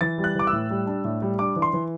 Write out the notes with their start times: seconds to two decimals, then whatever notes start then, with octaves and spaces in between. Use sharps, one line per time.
0.01 E3 A6
0.18 G3
0.24 F#6
0.35 E3 D6
0.47 E6
0.53 A2
0.70 G3
0.87 D4
1.04 A2
1.22 G3
1.39 D4 D6
1.56 E3
1.62 C6
1.73 E3